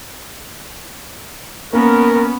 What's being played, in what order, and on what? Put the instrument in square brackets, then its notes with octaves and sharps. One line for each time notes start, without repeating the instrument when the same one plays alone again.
[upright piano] A#3 [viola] B3 C#4 [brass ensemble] A#4